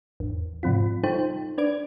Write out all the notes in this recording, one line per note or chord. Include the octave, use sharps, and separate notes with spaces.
G#1 E2
G#2 C3 F3 C4 F4
G3 D#4 F4 A4 C5 G5
D4 B4 D5 G#6 D7